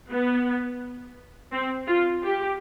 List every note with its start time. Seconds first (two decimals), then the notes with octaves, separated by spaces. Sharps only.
0.10 B3
1.52 C4
1.88 F4
2.23 G4